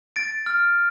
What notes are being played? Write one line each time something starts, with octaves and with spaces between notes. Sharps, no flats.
A6 D7
F6